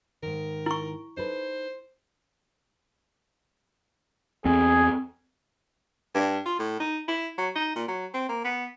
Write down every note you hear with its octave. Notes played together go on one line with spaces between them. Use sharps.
G#2 D#3 A#4
E4 C#6
D#4 A4 B4 C5
E2 C4 G#4
G2
F4
A2
D#4
E4
F#3
D#4
A#2
F#3
C4
A#3
B3